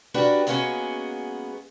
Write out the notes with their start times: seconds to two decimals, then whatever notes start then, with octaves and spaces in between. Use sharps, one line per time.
0.14 D4 F#4 G4 A#4 B4
0.47 G#3 A#3 B3 C#4 F#4 G#4